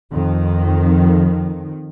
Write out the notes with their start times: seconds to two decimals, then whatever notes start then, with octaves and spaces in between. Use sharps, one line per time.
0.11 F2 D#3